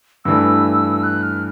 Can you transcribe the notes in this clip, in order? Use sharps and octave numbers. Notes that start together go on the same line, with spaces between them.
G2 E3 A3 E6
F#6
F6